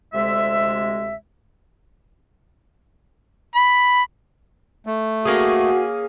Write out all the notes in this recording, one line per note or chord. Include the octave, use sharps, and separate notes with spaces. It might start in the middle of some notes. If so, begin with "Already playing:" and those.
D2 C3 G#3 E5
B5
A3
A#3 C#4 F#4 G#4